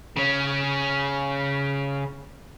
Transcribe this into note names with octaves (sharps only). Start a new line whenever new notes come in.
C#3 C#4